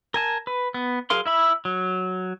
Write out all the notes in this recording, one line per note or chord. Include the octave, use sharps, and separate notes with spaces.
A#4 G#5 A5
B4
B3
F#3 G#4 A#4 F5 C6
E4 E5 B5
F#3